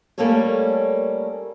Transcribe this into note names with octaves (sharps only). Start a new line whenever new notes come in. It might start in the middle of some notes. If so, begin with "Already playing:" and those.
G3 A3 A#3 C#4 A4 C#5